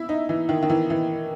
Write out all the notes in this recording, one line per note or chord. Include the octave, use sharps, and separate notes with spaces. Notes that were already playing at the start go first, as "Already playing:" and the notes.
Already playing: E4
D#4
E3
D#3
D#3
E3
E3